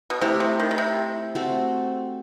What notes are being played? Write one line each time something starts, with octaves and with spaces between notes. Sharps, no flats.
B2
C3 A3 E4 G4
C3
D#3
D#3
C3
A3 C4 F#4 A4